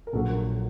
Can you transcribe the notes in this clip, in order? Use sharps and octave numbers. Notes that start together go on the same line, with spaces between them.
A#4
A#1 A#2 F#3 A4